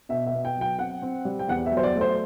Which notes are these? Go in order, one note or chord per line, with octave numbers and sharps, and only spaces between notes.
B2 E5
E5
B3
G5
F#3 G5
C4 F#5
C4
G3
G5
E2 F#5
E5
F#3
C5
D5
A3
C5